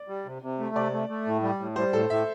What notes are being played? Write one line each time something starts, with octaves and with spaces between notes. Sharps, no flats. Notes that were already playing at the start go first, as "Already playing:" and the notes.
Already playing: D5
G3
C3
C3
A3
C3 D5
A3
A3
A2
G3
A2
G3 C5
A2 A4
A2 E5